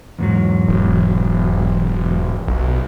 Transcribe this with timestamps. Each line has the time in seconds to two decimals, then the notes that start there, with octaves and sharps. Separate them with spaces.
0.19 E2 G#2 F#3
0.68 E1
2.47 B1